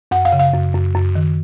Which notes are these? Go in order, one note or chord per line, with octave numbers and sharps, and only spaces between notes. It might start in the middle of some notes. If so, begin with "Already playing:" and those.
F#2 F#5
F5
C#3
F5
F#2
F#2
F#2
D#3